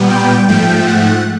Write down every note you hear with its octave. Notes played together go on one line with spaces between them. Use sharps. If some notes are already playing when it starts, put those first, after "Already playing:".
Already playing: A#2 G3 B3
G5
G#2 F3 A3 G5
F#5